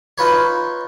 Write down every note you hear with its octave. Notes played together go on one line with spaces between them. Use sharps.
D#4 F4 B4 C#5